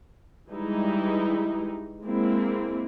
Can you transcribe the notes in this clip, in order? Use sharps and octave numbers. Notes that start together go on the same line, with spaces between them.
E3 G3 G#3 D#4 E4
G#3 A#3 C4 E4